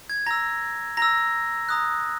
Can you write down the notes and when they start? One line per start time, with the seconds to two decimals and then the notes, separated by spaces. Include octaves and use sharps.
0.10 G#6
0.26 A#5 E6 A#6
0.97 A#5 E6 A#6
1.69 A#5 D#6 F#6